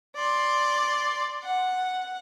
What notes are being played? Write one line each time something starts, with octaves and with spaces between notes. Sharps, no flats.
D5 C6
F#5